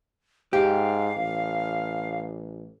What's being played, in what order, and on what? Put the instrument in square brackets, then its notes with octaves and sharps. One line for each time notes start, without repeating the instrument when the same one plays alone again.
[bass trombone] G#2 [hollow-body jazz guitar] G4 [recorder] F5
[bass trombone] A1